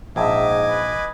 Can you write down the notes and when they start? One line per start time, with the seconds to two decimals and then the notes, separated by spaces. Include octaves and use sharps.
0.16 A#1 G#2 D#5 E5 G#5 D6
0.69 B4